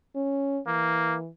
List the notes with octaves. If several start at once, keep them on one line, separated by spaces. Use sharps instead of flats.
C#4
E3 A#3